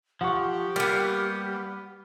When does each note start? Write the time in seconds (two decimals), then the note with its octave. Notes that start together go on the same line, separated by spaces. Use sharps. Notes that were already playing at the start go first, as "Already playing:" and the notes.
0.21 F3 G4 F#5 C#6
0.76 G3 A#3 B3